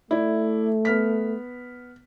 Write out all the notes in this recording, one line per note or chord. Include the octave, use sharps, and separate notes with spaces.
A3 E4 D5
B3 F6 B6